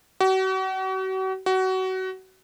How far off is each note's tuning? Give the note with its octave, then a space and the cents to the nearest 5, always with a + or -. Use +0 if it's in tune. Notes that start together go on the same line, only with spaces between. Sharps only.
F#4 +40
F#4 +25